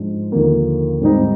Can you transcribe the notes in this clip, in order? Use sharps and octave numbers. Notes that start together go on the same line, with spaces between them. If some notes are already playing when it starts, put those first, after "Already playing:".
Already playing: G#2 F3 G#3 D4
D#2 D3 F3 A#3
G#2 G3 C4 D#4